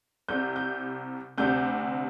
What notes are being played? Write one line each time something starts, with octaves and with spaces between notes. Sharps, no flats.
C2 C3 G3 G6
G6
D2 C3 G3 C4 G6